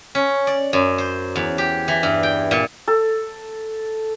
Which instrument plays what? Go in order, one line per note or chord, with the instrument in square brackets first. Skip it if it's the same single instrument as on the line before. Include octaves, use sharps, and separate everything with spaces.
[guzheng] C#4
D5
F#2
C5
E2
G4
E3
G2
G5
A#2
[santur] A4